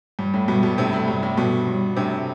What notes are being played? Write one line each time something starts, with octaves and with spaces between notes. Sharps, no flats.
G2 G3
A2
G2 B2 G3
G2 B2
A2 C3 D4
A2
G2 G4
A2
G2 B2 G3
G3
A2 C3 D4